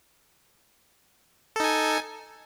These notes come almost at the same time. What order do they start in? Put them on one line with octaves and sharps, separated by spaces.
A4 D#4 G#5